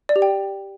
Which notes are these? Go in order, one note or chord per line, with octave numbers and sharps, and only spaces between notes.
D5
G4
G5